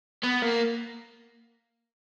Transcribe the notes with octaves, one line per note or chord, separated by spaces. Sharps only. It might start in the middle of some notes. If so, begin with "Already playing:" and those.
B3
A#3